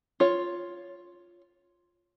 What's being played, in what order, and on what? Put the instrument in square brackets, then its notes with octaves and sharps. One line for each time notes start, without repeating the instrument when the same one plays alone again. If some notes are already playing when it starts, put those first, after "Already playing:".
[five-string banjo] F4 C#5